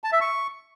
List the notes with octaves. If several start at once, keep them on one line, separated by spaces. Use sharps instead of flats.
A5
E5
C#6